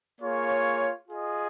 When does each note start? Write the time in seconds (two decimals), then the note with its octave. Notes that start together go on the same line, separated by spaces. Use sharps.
0.21 A#3 F4 G#4 C#5
1.08 F4 G#4 D#5